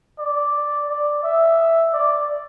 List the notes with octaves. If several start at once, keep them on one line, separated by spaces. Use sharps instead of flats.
D5
D5
E5
D5